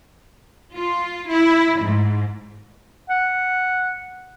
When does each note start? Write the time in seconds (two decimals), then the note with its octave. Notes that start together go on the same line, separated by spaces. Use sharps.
0.74 F4
1.29 E4
1.82 G#2
3.10 F#5